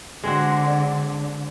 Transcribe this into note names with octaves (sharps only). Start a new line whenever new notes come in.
D3 G#3 C4 F#4